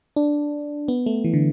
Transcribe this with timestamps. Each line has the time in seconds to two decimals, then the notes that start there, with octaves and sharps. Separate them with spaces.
0.16 D4
0.88 B3
1.06 A3
1.24 E3
1.34 D3